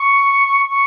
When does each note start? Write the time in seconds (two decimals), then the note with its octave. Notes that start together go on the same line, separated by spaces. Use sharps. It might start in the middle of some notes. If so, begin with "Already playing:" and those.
Already playing: C#6
0.70 C#6